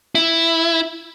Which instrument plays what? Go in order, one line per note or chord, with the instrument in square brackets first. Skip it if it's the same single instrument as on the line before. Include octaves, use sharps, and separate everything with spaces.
[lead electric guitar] E4